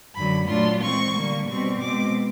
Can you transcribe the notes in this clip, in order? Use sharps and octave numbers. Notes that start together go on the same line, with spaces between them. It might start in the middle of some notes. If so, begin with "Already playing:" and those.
F#2 D3 F#3 B5
A#2 F#3 A3 D4 F4 C6
E3 G#3 C4 C#6
D3 G3 A#3
B2 G3 C4 C#6
B2 G#3 C4 D6